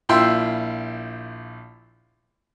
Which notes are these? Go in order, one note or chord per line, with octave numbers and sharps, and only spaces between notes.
A#1 E4 F4 G5 C6 E6